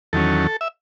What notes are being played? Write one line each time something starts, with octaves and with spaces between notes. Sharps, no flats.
E2 D#3 F#3 C#4 A4
E5